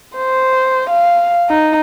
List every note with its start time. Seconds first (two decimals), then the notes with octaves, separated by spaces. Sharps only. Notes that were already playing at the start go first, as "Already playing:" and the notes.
0.17 C5
0.90 F5
1.50 D#4